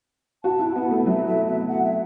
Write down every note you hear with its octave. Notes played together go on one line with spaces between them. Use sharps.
F#4 A5
E4
A5
B3 F#5
A3
F#3 E5
E5
E5
F#5
E5